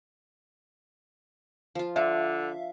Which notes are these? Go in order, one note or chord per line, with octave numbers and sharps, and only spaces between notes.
F3 F4
D3 D4 E5 F5